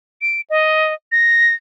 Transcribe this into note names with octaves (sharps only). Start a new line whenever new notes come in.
D7
D#5
A#6